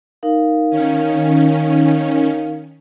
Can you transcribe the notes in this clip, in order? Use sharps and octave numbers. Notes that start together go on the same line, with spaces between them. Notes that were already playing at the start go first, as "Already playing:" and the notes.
D#4 A#4 F5
D#3 C#4